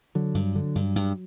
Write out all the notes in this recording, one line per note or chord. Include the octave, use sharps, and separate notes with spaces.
D3 F#3
G2
D3
G2
G2